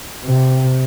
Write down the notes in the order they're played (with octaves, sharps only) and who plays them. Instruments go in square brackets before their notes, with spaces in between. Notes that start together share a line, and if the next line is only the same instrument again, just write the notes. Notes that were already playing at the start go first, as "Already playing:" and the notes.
[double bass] C3